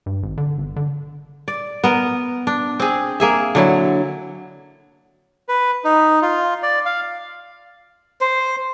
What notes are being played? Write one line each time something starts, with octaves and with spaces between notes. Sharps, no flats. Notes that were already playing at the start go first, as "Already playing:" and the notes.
G2
G#1
D3
G1
D3
D5
B3 A#4
D4
C4 G#4
A#3 G#4 E5
D3 F#3 E4
B4
D#4
F4
D5
F5
C5